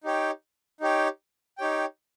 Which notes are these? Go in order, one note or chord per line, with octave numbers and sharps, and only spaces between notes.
D#4 G4 C#5 G5
D#4 G4 C#5 G5
D#4 G4 C#5 G5